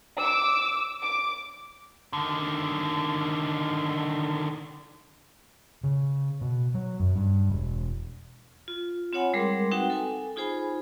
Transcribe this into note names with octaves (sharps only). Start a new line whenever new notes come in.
D6 E6
D6
D3 D#3
C#3
B2
F#3
F#2
G2
E1
F4
C4 F4 C#5 F#5 G#5 B5
G3 G#3 G#4 A#4 C6 D6
C4 D#4 F#4 B4 F#5 G5
A4 G#5
D#4 F4 G#4 C5 G#5 B5